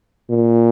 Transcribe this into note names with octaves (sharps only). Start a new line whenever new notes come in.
A#2